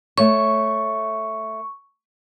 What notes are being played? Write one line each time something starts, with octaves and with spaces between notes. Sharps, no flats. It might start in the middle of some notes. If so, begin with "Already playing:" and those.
A3 C#5 C#6